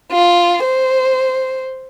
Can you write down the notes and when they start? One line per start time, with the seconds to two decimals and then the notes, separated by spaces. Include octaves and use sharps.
0.12 F4
0.64 C5